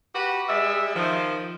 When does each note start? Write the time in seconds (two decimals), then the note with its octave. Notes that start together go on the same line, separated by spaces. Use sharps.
0.14 F#4 G4 B4 F#5
0.48 G3 G#3 E5
0.95 D#3 F3